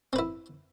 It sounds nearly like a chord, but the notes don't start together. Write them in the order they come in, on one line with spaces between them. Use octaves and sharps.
C4 B4 E4